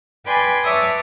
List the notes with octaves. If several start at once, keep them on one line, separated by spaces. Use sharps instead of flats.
B4 D5 G5 G#5 B5 C6
B4 C#5 D5 E5 A5 D#6